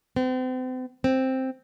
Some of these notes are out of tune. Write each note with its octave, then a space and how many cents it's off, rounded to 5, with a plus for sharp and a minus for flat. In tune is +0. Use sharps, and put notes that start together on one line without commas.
C4 -40
C4 +5